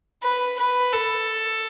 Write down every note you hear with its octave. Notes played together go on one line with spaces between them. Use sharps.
B4
B4
A4